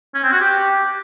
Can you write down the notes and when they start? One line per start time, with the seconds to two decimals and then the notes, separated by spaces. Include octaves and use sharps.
0.14 C#4
0.23 C4
0.32 F#4
0.41 G4